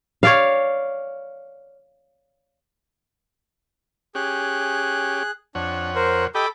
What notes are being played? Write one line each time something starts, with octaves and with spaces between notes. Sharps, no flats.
C#5 D5 F5
C#4 G4 G#4 F#6
F2 D4 C#5 F#5
A#4 C5
G4 A4 D#5 G5 B5 D6